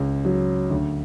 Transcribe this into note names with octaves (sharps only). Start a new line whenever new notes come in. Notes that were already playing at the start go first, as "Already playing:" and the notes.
Already playing: C#2 C#4
F#3
D2